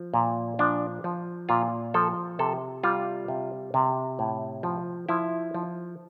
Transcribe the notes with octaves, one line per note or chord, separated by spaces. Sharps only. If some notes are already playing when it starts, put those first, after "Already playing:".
Already playing: F3
A#2
F3 D4
F3
A#2 F4
F3 A4
C3 A4
G3 F4
C3
C3
A2
F3
F3 E4
F3